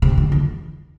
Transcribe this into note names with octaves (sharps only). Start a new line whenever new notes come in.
C3
D3
E2